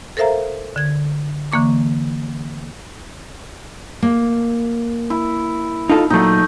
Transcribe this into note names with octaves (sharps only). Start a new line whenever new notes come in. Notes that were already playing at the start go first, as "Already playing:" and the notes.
A4 A#4 C5 E5 F5 A#5
D3 G#6
D3 E3 A#3 C#6 D6
A#3
E4
D#4 F4 A4
A#2 F#3 A3 D#4